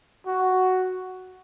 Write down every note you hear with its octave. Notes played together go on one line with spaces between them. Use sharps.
F#4